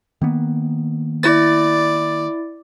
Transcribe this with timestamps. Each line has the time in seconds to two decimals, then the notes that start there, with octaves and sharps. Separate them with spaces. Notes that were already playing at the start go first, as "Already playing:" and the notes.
0.22 D#3 A#3 B3
1.23 E4 D5 A6